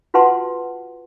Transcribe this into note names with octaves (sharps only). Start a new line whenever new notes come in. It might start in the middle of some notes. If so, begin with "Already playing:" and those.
F4 F#4 B4 F#5 A5 C6